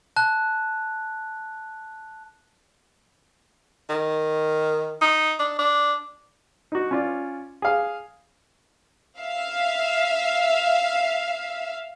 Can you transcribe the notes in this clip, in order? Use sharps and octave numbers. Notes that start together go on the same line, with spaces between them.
A5 F#6
D#3
D#4
D4
D4
D#4 F#4
C#4 F4 D5
G#4 F5
E5 F5